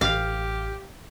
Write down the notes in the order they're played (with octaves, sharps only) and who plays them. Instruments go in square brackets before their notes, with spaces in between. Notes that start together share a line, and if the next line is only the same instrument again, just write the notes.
[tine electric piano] A1 F6 [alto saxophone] G4 [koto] F5